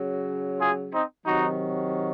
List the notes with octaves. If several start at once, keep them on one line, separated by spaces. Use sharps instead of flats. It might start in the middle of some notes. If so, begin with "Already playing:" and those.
Already playing: C#3 F#3
F4 G#4
C4 D#4
C3 D#3 F#3 D#4 F#4